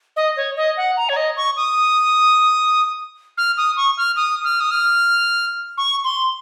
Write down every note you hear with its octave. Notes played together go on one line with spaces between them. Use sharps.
D#5
C#5
D#5
F#5
A#5
C#5
D#5
C#6
D#6
F6
D#6
C#6
F6
D#6
F6
D#6
F6
C#6
C6